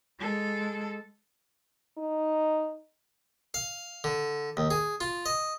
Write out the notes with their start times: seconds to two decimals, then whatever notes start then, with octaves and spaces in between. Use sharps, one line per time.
0.19 G#3 A4
1.98 D#4
3.54 F5
4.04 D3
4.57 D#2
4.71 G#4
5.01 F4
5.26 D#5